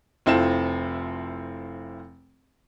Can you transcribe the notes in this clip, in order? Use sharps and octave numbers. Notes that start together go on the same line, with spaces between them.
F1 C4 E4 F4 A4 E7